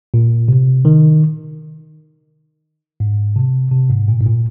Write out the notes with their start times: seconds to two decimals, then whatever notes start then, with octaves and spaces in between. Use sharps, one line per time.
0.14 A#2
0.48 C3
0.85 D#3
3.00 G#2
3.36 C3
3.71 C3
3.90 G#2
4.08 A#2
4.21 G#2
4.26 A#2